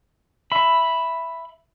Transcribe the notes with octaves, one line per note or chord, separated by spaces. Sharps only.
E5 B5